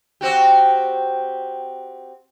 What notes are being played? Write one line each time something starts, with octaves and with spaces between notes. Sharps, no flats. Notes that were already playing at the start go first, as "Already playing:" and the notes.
C4 F#4 G4